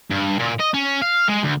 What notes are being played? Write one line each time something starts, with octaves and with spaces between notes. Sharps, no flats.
G2
A#2
D#5
C#4
F5
G#3
D2